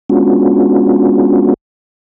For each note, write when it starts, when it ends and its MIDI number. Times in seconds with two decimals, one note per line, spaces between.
0.10 1.54 56
0.10 1.54 59
0.10 1.54 61
0.10 1.54 62
0.10 1.54 65
0.10 1.54 66